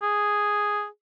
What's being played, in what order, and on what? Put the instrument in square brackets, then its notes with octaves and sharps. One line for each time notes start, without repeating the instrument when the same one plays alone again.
[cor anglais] G#4